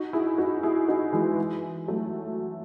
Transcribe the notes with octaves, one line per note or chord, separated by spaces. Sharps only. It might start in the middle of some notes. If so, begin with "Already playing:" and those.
Already playing: D#4 F#4
E4 G#4
D#4 F#4
E4 G#4
D#4 F#4
E3 G#3
F#3 A3